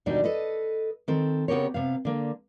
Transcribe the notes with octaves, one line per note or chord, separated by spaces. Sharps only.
D#2 B2 G3 D4 D#4
A4 B4 D#5
D#3 C4 A4
C#3 B3 C4 G4 A#4 C#5
C3 B3 F5
D3 A#3